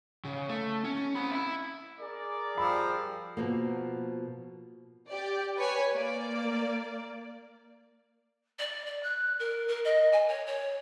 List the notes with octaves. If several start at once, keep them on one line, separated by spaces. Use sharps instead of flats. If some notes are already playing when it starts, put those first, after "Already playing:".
C#3
A3
C#4
C4 B5
E5 B5
G#4 A#4 D5
F3 G3 B5 E6
B2 F3 A#3
G4 D5
B4 C#5 G#5
A#3 D5
D5
D5
F#6
A#4
A#4
D#5
G#5
C#5
C#5